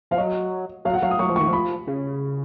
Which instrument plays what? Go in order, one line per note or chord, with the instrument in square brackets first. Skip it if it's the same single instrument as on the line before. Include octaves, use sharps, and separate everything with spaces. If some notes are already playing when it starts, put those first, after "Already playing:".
[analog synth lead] F3 [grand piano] F5
[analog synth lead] F#3 [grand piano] D#5
[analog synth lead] F#3 [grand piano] F5
[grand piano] F#5
[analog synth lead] F#3 [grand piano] F5
[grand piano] D#6
[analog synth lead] F#3 [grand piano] C#6
[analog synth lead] F3
[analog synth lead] D#3 [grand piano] C#6
[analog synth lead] F3 [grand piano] B5
[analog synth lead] C#3